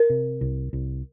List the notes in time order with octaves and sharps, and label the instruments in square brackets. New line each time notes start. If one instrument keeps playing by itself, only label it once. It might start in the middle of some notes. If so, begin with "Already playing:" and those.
Already playing: [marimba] A#4
[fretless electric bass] C3
C2
C2